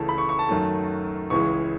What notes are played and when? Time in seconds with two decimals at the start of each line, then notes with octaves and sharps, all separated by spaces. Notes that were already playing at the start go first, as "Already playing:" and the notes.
Already playing: C#2 C#3 E3 A3 A5
0.09 B5
0.18 C#6
0.29 C#6
0.39 A5
0.49 F#2 D#3 F#3 A3
1.30 C#2 C#3 E3 G#3 C#6